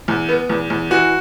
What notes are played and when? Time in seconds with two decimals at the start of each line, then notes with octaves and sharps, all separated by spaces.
0.08 E2
0.29 B3
0.49 E2
0.70 E2
0.90 E3 F#4